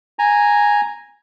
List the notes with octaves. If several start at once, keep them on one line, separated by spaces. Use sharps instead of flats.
G#5 A#5